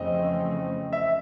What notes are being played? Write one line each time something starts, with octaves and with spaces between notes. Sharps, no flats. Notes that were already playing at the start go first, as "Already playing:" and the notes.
Already playing: F2 C#3 E3 A3 C4 D#5
E5